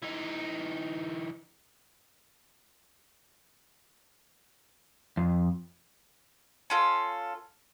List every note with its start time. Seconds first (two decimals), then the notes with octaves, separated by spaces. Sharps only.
0.02 E3 D#4
5.17 F2
6.70 C#4 F4 A4